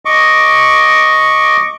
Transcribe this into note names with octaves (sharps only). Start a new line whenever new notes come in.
D#5 C#6 D6